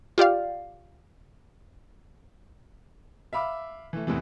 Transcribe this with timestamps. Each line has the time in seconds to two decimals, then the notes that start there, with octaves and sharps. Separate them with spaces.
0.18 F4 G4 D5 F5
3.33 E5 F5 B5 D6
3.93 E3 A3
4.07 E2 A2 C3 E3